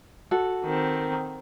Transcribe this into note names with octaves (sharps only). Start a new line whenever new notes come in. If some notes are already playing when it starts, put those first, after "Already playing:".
F#4 A4
D#3 C4